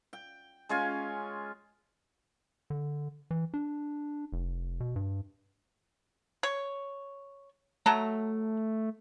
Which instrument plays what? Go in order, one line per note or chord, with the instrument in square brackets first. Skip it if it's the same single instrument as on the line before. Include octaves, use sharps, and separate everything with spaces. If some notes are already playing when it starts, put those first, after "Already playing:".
[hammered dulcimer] G5
G#3 C#4 F4 G#5
[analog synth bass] D3
E3
D4
F1
B2
G2
[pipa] C#5
[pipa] F#3 A5 A#5 [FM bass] A3